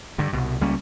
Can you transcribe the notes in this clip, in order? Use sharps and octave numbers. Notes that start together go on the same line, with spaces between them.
G2 D3
C2 B2
C#2 G3 A#3 C#4